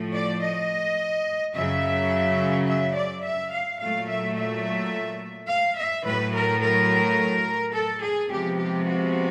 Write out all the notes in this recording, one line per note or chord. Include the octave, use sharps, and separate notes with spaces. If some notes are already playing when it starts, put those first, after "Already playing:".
Already playing: A2 F3 A3
D5
D#5
F#2 C#3 F#3 E5
E5
D5
E5
F5
A#2 F#3 A3 F5
E5
E5
F5
E5
A2 F#3 A3 B4
A#4
A#4
A4
G#4
C3 F3 G#3 B3 G4
G4
F#4